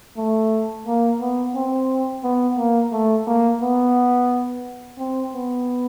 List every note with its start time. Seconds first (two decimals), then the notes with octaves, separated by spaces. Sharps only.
0.18 A3
0.87 A#3
1.21 B3
1.55 C4
2.24 B3
2.58 A#3
2.92 A3
3.27 A#3
3.61 B3
4.98 C4
5.33 B3